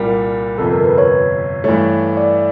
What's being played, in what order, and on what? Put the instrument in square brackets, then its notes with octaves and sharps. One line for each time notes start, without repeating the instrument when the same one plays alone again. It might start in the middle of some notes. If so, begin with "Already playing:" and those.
Already playing: [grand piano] C2 A#2 G3 [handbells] A#4
[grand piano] G1 F2 C3 [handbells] A4
[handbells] A#4
B4
C#5
[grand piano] G2 E3 A3 [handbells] C#5
[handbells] D5